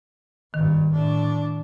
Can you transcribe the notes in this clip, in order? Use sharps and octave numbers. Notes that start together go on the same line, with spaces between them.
G#1 G2 D#3
A2 D4